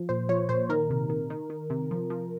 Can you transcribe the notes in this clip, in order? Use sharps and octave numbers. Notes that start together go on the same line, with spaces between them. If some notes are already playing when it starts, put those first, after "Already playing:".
Already playing: F3
A#2 C5
F3 C#5
A#2 C5
D#3 A#4
C3
D#3
D#3
D#3
C3
F3
F3